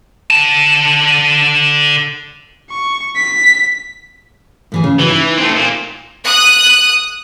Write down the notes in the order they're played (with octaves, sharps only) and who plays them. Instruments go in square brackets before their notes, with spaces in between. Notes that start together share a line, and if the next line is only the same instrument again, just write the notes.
[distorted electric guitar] D3 A5
[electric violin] C#6
B6
[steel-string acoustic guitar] A2 E3 G#4
C#3
[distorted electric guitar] E3 [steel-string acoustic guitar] F#4 B4
[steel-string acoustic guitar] D#4
[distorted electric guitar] A3 C4
A#2
[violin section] D#6 F#6